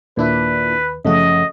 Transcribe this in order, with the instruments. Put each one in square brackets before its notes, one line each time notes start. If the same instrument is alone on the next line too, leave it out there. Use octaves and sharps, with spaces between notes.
[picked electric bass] D#2 [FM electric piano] A#2 D4 E4 [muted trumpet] B4
[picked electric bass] F#1 F3 [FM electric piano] C#3 A3 F#4 [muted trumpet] D#5